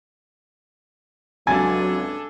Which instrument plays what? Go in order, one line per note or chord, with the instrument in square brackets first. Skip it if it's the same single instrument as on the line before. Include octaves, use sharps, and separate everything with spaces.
[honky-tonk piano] C#2 C3 A6 [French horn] F#3 [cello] D4 A4 [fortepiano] G#5